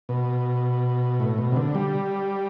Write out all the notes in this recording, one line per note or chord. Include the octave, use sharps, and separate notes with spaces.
B2
A2
B2
C3
D3
G3